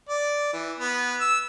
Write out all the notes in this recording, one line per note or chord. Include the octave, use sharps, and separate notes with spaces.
D5
E3
B3
E6